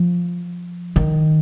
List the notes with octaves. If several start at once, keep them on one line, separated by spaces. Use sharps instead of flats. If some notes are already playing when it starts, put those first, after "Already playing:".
Already playing: F3
D#3